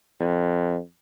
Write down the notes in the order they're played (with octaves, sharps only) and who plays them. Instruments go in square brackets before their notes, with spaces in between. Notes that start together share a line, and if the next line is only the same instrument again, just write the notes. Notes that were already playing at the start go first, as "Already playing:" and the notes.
[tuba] F2